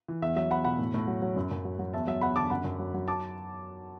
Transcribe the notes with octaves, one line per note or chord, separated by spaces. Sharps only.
E3
E2 E5
F#3 E5
E2 F#5 B5
B2 F#5 B5
A2
A2
F#3
F#3
F#2
F#2
F#3
F#3
E2 E5 A5
F#3 E5
E2 F#5 B5
D3 A5 D6
F#2 F#5 B5
F#2
F#3
F#3
A5 D6